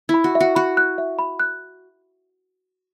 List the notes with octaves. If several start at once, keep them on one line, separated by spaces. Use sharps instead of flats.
E4
B5
F#4
E5
F#4
F#4 B5
F#6
E5
B5
F#6